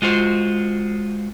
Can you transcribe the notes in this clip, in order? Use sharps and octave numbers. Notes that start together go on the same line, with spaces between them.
G#3 F4 F#4 C5